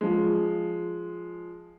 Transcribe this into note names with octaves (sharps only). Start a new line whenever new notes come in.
F3 G#3